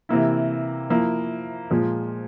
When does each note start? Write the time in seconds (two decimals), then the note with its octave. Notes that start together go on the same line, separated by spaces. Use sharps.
0.09 C3 E3 A#3 E4
0.90 F3 A#3 E4
1.71 A#2 F3 G#3